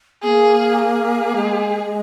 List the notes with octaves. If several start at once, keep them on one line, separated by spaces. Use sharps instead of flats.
A#3 B3 G#4
G#4
G#3